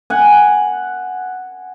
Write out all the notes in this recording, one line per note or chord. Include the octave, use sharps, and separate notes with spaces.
F#5 G#5